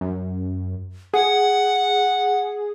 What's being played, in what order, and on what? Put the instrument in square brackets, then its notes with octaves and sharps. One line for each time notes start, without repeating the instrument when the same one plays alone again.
[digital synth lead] F#2
[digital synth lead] G#4 [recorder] F#5